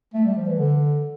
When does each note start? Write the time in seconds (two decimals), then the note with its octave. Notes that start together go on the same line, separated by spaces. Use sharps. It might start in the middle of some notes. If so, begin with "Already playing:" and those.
0.14 A3
0.25 G3
0.37 F3
0.47 E3
0.58 D3